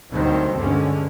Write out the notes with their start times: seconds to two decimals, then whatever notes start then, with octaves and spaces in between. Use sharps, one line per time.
0.11 D2 D#3 F#3 G3 C4
0.53 D2 G2 D3 G#3 C#4